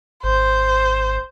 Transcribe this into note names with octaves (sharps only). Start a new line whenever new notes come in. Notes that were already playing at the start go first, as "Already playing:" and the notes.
G#1 C5